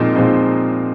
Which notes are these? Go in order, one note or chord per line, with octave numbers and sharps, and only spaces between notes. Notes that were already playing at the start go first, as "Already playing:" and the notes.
Already playing: A#2 F3 G#3 C4 D#4
A#2 F3 G#3 C4 D#4